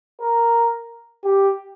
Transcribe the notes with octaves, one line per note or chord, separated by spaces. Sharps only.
A#4
G4